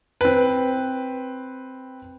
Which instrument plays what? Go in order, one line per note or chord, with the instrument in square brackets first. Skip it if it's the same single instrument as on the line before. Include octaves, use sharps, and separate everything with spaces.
[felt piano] C4 B4